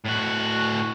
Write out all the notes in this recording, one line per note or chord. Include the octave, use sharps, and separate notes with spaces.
A2 F#4